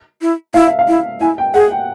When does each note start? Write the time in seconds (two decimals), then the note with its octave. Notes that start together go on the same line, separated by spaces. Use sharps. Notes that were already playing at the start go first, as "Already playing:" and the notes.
0.21 E4
0.54 E4 F5
0.67 E5
0.79 F5
0.88 E4
1.20 E4 G#5
1.38 G5
1.54 G#4 F#5
1.71 G5